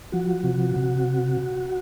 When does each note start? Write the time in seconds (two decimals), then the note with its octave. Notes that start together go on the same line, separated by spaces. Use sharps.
0.12 F3 F#4
0.44 C3
0.76 C3